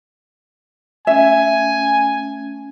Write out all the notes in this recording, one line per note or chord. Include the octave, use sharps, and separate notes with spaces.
A3 C#4 E5 G#5